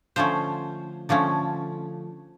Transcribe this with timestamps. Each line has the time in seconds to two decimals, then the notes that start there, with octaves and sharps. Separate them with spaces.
0.16 D3 F3 A3 C#4 C5
1.09 D3 F3 A3 C#4